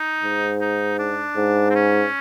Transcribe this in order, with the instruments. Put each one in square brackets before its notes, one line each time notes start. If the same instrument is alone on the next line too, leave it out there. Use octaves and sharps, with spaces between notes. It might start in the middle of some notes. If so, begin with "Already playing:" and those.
Already playing: [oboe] D#4
[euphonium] G#2
[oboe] D#4
D4
[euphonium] G#2
[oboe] C4
C#4